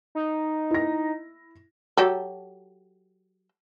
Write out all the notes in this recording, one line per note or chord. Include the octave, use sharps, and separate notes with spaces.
D#4
E4 A#6
F#3 G4 A4